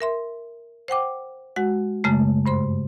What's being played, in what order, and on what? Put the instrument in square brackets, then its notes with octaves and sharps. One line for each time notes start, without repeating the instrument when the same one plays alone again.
[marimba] A#4 E5 C6
C5 F#5 G5 D6
G#3 F#4 F#5
F#2 C#3 G#3 A3
G2 C5 C6